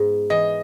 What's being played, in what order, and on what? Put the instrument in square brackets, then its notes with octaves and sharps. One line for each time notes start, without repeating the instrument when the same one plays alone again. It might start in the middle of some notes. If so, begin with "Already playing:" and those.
Already playing: [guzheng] G#2 B3
[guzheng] E3 [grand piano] D#5